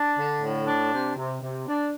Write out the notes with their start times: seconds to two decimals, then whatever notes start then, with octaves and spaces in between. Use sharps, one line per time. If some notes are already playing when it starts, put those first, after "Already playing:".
Already playing: D4
0.16 D3
0.41 A2
0.66 D4
0.92 C3
1.16 C3
1.41 C3
1.67 D4